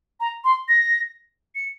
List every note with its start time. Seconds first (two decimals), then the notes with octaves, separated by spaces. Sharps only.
0.20 A#5
0.44 C6
0.69 A#6
1.55 C#7